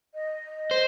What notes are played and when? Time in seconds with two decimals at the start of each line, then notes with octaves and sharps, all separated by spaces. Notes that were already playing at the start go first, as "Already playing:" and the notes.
0.15 D#5
0.71 C5